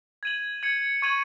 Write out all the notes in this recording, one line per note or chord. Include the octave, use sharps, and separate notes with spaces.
G#6 D#7 F#7
G#6 C#7 F#7
C#6 G#6 D#7 F#7